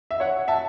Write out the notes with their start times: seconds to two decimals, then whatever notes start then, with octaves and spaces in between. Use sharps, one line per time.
0.11 E5
0.20 C#5 F#5
0.48 E5 A5